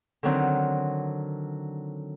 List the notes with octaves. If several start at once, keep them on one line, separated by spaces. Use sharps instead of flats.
D3 D#3 F#3 C4